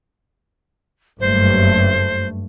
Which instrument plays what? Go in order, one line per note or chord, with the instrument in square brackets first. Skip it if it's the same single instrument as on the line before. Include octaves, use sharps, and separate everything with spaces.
[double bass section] F#1 G2 A3 [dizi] C5